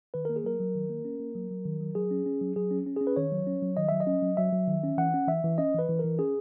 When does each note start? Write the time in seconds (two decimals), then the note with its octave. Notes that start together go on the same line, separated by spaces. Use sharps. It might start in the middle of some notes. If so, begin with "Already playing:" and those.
0.14 D#3 B4
0.25 A#3 A#4
0.36 G#4
0.44 F#3 A#4
0.60 F#3
0.75 D#3
0.90 A#3
1.05 C#4
1.20 A#3
1.35 F#3
1.51 F#3
1.65 D#3
1.80 F#3
1.95 F#3 G#4
2.11 C#4
2.26 C#4
2.41 F#3
2.56 F#3 G#4
2.71 C#4
2.86 C#4
2.97 C#4 G#4
3.07 B4
3.16 D#3 C#5
3.32 F#3
3.47 C#4
3.62 F#3
3.77 D#3 D#5
3.89 F#3 E5
4.00 D#5
4.07 C#4
4.22 F#3
4.37 F#3 E5
4.52 F#3
4.68 D#3
4.83 C#4
4.98 E3 F#5
5.14 C#4
5.28 E3 E5
5.44 E3
5.58 C#4 D#5
5.74 E3 B4
5.89 E3
5.99 E3 A#4
6.19 C#4 G#4